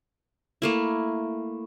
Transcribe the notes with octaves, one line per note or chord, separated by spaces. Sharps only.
A3 A#3 E4